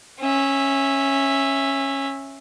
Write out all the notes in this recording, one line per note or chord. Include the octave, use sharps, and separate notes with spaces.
C#4 E5